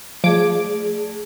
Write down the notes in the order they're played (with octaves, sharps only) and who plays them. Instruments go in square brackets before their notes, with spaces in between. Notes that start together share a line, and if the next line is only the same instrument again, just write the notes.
[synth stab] F3 D6 [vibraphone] A3 G#4 D5